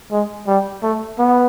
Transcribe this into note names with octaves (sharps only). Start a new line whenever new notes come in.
G#3
G3
A3
B3